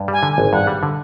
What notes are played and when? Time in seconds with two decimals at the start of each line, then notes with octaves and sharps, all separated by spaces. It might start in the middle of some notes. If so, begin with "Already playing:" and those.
Already playing: G2
0.08 G3 G#5
0.23 D3
0.33 G#5
0.38 G#1
0.53 G2 F#5
0.67 G3
0.83 D3